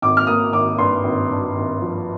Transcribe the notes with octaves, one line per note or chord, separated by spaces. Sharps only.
G#1 D6
F6
A#3 D#6
G#1 D6
G2 C6
G#1
G2
G#1
F3